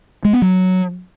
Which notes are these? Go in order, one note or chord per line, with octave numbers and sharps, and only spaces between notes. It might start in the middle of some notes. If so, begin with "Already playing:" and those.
G#3
B3
F#3